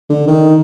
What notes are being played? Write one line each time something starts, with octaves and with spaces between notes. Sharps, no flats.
D3
D#3